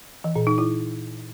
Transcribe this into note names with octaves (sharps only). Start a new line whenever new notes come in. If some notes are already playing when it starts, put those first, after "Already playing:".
E3
A#2
D#4
E4